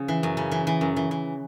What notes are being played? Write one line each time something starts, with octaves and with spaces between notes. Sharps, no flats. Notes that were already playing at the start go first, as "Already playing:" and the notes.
Already playing: C#3 F3
E3
F#2
C#3
E3
E3
F#2
E3
E3